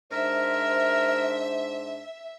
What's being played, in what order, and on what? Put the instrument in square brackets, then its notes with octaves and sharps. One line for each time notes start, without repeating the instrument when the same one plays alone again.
[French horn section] G#2 D4 C5 [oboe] A#4 [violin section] E5